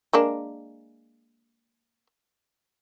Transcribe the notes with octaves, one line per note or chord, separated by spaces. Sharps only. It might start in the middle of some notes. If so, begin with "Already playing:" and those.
G#3 A#3 D4